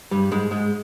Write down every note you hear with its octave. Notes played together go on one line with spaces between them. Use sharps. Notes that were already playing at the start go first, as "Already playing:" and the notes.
G2 G3
G#2 G#3
G#2 G#3